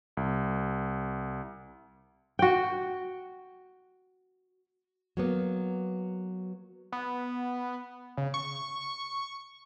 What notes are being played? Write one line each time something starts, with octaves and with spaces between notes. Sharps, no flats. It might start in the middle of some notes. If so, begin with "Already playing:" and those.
C2
F#4 G5
F#3 A#3 B3
B3
C#3
C#6